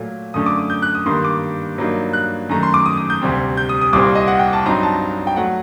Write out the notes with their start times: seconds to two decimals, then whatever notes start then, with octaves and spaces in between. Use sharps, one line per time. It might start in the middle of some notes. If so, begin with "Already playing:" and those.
Already playing: A#2 F#3 A3
0.34 F#2 D3 A3 D#6
0.46 D6
0.58 D#6
0.70 G6
0.82 F#6
0.95 D#6
1.06 G2 D#3 G3 A#3 C6
1.24 D6
1.78 G2 F#3 A#3 D#4
2.13 F#6
2.49 F#2 D#3 A3 A#5
2.63 C6
2.74 D6
2.86 D#6
2.97 D#6
3.10 G6
3.22 D2 C3 G3 C4
3.57 G6
3.69 D#6
3.81 D#6
3.93 C2 A#2 G3 C4 D6
4.15 D#5
4.27 F#5
4.39 G5
4.53 A5
4.66 G2 F#3 C4 D#4 A#5
4.83 A5
5.27 G5
5.36 F#3 A3 F#5